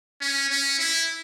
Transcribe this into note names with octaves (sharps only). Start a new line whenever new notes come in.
C#4
C#4
E4